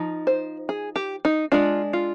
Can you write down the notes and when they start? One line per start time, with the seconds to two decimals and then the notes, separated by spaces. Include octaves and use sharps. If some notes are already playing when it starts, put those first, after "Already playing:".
Already playing: F3 D#4
0.27 C5
0.69 G#4
0.96 G4
1.25 D#4
1.52 G#3 D4 F4
1.93 F4